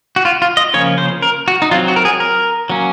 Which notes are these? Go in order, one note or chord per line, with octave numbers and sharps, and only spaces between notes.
F#4
F4
F4
D#5
C#3 F3 A#3 C#4 C#5
C5
A#4
F#4
D#4
F#3 C4 F4
F#4
A#4
G#4
A#4
F#3 A#3 C#4